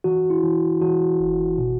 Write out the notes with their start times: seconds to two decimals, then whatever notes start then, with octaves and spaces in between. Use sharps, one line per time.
0.04 E3 F#4
0.30 E4
0.43 E3
0.82 E3 F#4
1.20 G1
1.58 B2